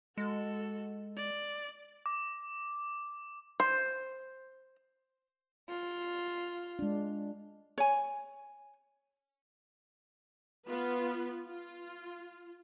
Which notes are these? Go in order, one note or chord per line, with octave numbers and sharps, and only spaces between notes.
G#3 F#4 A4
D5
D6
C5
F4
G#3 D4
C#5 G#5
B3 F4 B4
F4